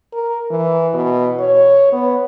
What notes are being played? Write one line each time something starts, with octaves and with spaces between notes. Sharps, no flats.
A#4
E3
B2
C#5
B3